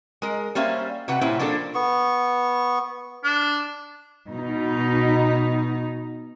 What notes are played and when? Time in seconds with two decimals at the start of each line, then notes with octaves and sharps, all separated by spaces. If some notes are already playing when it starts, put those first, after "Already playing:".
0.22 G#3 A#4
0.55 G3 A#3 C#4 C5 E5 F5
1.08 C3 F#4 B4 F#5
1.21 A#2 G3 C#4 E4 C5
1.39 F3 A#3 D4 F4 A4
1.75 B3 C#6
3.24 D4
4.29 B2 D#4